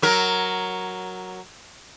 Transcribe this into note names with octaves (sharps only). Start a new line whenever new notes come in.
F#3 A#4